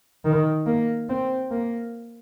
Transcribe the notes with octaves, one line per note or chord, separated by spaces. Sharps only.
D#3
A#3
C4
A#3